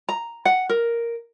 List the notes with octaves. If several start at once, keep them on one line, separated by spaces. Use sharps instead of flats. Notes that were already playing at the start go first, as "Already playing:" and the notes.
A#5
F#5
A#4